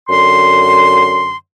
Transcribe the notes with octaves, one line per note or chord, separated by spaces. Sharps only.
F#2 D3 C6